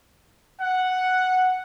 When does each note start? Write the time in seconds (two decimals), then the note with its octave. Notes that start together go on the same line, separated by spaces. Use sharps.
0.60 F#5